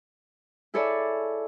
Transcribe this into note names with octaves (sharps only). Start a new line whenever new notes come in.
E4 G#4 A4 C#5 D5 E5